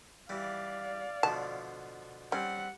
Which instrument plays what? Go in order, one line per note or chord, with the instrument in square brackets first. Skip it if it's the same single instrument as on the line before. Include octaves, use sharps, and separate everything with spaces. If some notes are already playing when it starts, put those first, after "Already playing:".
[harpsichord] E3 G3 [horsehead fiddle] D5 F5
[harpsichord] B2 D3 F3 [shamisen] A5
[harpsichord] G3 C4 [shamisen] C#4 [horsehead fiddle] F#5